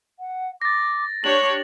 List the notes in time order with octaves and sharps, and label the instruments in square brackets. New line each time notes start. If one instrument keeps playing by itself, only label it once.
[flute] F#5
[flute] D6 [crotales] A6 A#6
[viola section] D4 G4 C#5 [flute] C#6 [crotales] F#7